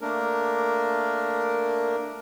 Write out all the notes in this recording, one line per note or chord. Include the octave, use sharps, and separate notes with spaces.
A3 A#3 D4 A#4